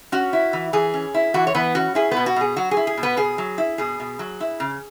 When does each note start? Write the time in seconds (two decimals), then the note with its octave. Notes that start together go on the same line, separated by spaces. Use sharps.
0.12 C#4 F#4
0.33 E4
0.53 E3
0.73 E3 G#4
0.94 C#4
1.14 E4
1.34 E3 F#4
1.47 C#5
1.55 E3 B3 B4
1.75 C#4 F#4
1.95 E4 G#4
2.11 B3 B4
2.17 B2
2.26 F#4
2.36 B2 G#4
2.57 F#3 F#4
2.71 G#4
2.77 E4
2.87 G#4
2.97 B2
3.03 B3 B4
3.17 B2 G#4
3.38 F#3
3.58 E4
3.78 B2 G#4
4.00 B2
4.19 F#3
4.40 E4
4.60 C#3